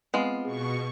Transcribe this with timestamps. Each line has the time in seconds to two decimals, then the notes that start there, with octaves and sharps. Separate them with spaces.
0.14 G#3 B3 C4 F4
0.45 B2 G#4 C#6